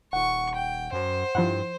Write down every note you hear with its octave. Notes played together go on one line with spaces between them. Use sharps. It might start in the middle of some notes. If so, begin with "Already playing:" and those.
D#1 F#5 C#6
G5
F#2 C5
G2 F3 E4 F#5